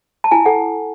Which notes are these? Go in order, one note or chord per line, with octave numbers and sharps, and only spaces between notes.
A5
E4 G#5
A4 F#5